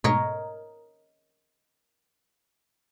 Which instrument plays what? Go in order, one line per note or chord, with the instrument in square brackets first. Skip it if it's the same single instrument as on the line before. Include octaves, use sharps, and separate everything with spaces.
[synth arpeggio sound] G#2 B2 A3 [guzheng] A#4 C#5 D#5